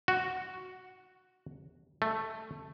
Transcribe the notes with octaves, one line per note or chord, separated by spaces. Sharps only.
F#4
A3